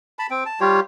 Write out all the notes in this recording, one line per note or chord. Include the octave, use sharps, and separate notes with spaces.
A5 B5
C4 G5
A5
G3 F4 G4 C#5